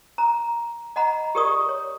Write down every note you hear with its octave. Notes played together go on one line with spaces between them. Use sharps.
A#5
D#5 F#5 A#5 B5
G4 G#4 A#4 D5 C#6 D#6
C#5